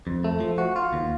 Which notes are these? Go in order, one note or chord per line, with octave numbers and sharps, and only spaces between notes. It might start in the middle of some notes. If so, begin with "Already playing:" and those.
F2
A3
F3
F#4
F4
D#2